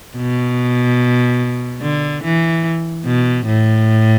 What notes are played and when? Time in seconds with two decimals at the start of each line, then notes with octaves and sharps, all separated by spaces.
0.16 B2
1.82 D3
2.24 E3
3.06 B2
3.47 A2